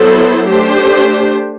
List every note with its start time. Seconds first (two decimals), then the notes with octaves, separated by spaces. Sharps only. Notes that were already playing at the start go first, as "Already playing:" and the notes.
Already playing: F#3 B3 E4 A4 C5
0.50 A3 D4 G4 C5